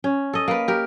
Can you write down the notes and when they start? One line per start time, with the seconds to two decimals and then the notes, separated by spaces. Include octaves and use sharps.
0.04 C#4
0.33 A4 D#5
0.48 A#3 B4
0.68 G4 A#4